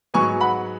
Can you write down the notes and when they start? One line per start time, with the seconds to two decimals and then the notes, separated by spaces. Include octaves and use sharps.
0.14 G#2 F#3 B3 G#5 C#6
0.41 F#5 B5